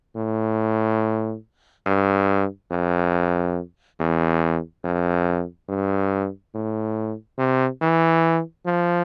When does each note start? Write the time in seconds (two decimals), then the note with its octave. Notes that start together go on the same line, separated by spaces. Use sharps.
0.16 A2
1.86 G2
2.71 F2
3.99 E2
4.84 F2
5.68 G2
6.54 A2
7.38 C3
7.81 E3
8.66 F3